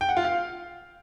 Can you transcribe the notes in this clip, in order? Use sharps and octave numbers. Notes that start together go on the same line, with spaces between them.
G5
F#5
F4
F5